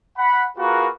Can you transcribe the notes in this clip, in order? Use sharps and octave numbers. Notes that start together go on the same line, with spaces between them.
F#5 B5
A#3 F4 F#4 G#4 A#4 B4